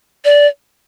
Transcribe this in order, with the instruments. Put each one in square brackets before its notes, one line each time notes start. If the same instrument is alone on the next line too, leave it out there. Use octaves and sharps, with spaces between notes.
[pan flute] D5